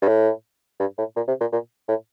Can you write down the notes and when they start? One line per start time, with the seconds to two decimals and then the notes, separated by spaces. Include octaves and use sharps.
0.02 G2
0.08 A2
0.80 G2
0.98 A2
1.16 A#2
1.28 C3
1.41 A#2
1.52 A#2
1.89 A2